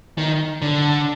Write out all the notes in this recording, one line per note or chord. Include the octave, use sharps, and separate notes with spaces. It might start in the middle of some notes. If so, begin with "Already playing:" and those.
D#3
D3